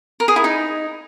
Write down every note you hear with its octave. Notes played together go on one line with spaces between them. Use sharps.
A#4
G#4
E4
D#4